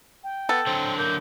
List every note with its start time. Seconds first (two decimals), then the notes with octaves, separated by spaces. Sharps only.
0.24 G5
0.49 B3 A4
0.67 D3 F#3 C4
0.98 A#3 G6